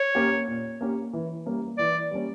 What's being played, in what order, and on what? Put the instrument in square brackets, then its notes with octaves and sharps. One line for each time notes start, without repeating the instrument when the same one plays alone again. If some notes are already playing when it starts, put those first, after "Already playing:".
Already playing: [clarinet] C#5
[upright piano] A#3 C#4 G4
A#2
A#3 C#4 G4
E3
G3 A#3 C#4
[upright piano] E3 [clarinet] D5
[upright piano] G3 A#3 C#4